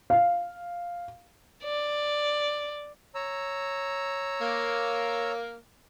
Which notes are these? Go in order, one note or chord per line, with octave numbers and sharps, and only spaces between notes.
F5
D5
C#5 A#5 E6
A#3